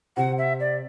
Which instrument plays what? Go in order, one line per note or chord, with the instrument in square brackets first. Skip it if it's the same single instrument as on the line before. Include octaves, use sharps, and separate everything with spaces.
[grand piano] C3 [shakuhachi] F#5
[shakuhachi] E5
D5